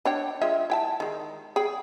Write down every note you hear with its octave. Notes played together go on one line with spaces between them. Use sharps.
D4 C#5 G5
G#3 F4 E5
E4 G5 A5
D#3 G#3
G#4 G5